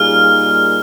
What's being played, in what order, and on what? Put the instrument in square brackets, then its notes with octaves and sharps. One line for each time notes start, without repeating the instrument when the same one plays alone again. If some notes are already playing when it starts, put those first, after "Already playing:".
Already playing: [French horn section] A#2 G3 A#3 D#4 G#4 [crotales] F6